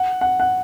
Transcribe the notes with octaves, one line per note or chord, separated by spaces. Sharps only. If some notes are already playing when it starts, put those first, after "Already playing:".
Already playing: F#5
F#5
F#5